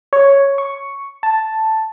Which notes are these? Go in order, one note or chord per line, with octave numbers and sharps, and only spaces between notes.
C#5
C#6
A5